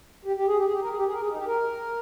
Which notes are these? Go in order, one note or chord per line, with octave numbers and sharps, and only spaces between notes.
G4
G4
G#4
G4
G#4
G4
A#4
G#4
G4
G#4
A#4
G#4
D#4
G4
A#4